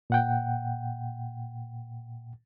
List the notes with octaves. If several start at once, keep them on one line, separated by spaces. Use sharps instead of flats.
A#2 F#5 G5